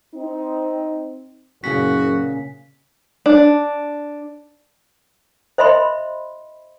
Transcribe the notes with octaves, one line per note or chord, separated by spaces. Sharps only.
C4 D#4
F#1 A#2 C#3 F#4 B6
D4
C5 D#5 E5 B5 C6